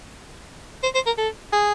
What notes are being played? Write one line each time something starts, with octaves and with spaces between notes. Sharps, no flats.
C5
C5
A#4
A4
G#4